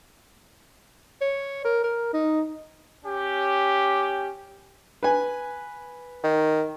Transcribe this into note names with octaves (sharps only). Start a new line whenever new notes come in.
C#5
A#4
A#4
D#4
C#4 G4
B4 G#5
D#3